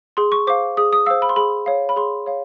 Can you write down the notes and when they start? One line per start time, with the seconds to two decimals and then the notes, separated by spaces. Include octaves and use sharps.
0.17 G#4 C6
0.32 C#6
0.47 C5 F5 D6
0.77 G#4 D#6
0.93 D#6
1.06 C5 F5 E6
1.22 B5
1.29 C6
1.36 G#4 B5
1.66 C#5 F5
1.89 B5
1.96 G#4 C6
2.26 C#5 F5